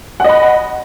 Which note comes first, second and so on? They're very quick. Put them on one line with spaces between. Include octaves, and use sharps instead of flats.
F#5 D#5 B5